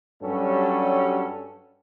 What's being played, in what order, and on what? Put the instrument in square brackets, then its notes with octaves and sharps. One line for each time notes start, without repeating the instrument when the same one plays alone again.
[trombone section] G2 F#3 G3 C#4 A4